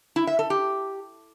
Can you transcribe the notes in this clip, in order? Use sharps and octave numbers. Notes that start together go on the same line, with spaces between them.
E4
E5
A4
G4